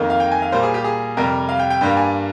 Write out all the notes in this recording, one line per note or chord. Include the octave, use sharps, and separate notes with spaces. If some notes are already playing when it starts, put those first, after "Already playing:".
Already playing: F2 D#3 A#3
F5
G5
G#5
F5
A#2 G3 A#3 C5
G#4
G4
G#4
F2 C3 G3 A#4
F5
G5
G5
G2 G3 A#3 G5
G#5